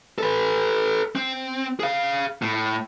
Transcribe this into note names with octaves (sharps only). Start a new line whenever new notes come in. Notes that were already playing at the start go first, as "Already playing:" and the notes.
A4 B4
C4
G#4 F5
A2